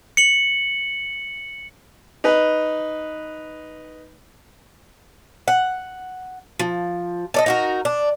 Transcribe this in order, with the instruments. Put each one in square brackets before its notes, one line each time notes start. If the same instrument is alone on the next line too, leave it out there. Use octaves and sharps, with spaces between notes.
[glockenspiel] C#7 F#7
[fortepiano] D#4 B4
[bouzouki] F#5
F3
A4 D5 D#5
D#4 F#4 A#4
D4